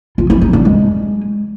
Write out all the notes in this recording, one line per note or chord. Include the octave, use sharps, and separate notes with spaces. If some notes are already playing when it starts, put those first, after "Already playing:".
F4
E4
D#4
D4
G#3